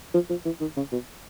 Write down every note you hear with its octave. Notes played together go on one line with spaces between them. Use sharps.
F3
F3
E3
D#3
C#3
B2